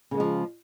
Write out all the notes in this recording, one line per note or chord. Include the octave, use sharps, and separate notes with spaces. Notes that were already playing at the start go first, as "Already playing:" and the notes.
C#3 F3 G#3 A#3